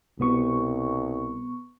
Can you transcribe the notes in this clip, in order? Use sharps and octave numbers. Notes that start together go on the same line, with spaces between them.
C2 B2 B3 C#6